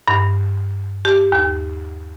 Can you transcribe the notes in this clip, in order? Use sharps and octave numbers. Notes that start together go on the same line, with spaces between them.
G2
G4
D#2